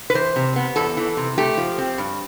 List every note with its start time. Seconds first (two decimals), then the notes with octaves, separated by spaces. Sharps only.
0.10 B4
0.14 E3 C5
0.36 C3
0.56 B3
0.76 E2 A4
0.97 E3
1.17 C3
1.38 A3 G4
1.57 F3
1.78 C4
1.98 G2